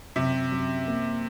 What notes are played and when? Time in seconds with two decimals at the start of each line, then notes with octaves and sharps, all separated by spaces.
0.15 F#2 C3
0.52 F#2
0.87 A#3